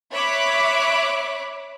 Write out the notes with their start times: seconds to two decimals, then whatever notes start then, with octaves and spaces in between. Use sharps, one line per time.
0.13 C#5 E5 B5 D6 F#6